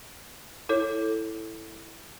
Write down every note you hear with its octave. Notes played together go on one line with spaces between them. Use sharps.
E4 A4 C#5